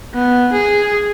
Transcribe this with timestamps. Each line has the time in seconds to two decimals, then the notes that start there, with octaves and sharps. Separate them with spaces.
0.14 B3
0.53 G#4